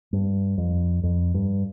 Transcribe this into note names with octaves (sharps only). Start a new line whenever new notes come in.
G2
F2
F2
G2